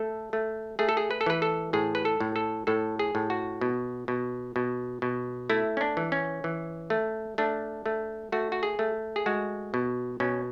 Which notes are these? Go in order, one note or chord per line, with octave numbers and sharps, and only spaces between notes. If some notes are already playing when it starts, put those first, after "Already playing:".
Already playing: A3 A4
A3
A3 G#4
A4
G#4
B4
A4
E3 B4
A4
A2 G#4
B4
A4
A2
A4
A2 A4
G#4
A2
F#4
B2
B2
B2
B2
A3 E4
C#4
D4
E3
C#4
E3
A3
A3 D4
A3
A3 F#4
F#4
G#4
A3
G#4
G#3 F#4
B2
B2 C#4